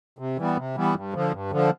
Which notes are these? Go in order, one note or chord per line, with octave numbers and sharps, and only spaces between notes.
C3
E3 G3 B3
C3
E3 G3 B3
G2
D3 F3
G2
D3 F3